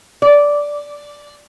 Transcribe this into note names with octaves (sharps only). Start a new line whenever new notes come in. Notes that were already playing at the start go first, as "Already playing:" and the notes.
D5